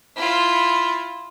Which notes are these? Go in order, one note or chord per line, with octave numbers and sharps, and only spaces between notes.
E4 F4